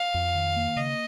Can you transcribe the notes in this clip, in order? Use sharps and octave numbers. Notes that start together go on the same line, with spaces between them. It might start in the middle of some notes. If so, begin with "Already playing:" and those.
Already playing: F5
F2
D#3
A#3
C#3 D#5